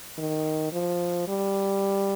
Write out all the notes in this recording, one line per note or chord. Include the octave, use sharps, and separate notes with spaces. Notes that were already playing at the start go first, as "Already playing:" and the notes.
D#3
F3
G3